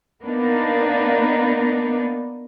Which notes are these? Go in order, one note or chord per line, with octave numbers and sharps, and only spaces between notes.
A#3 B3 D4 D#4